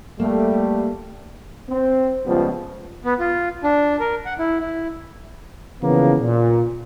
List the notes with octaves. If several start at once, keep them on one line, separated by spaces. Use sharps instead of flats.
G3 A3 A#3
C4
C#2 F3 G3 B3
B3
F4
D4
A#4
F#5
E4
E4
C#3 E3 F3 A#3 B3
A#2